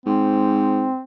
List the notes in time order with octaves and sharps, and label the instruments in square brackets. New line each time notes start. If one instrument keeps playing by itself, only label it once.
[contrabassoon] G#2 [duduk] C4